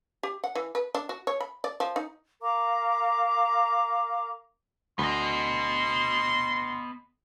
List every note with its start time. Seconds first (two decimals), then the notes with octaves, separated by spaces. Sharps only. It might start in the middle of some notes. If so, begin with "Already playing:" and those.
0.23 G4
0.44 F#5
0.55 E3
0.75 B4
0.95 D4
1.09 F#4
1.27 C#5
1.40 B5
1.64 D5
1.80 F3
1.96 D#4
2.41 A#4 F5 A#5 D6
4.99 D2 B3 D#5 C6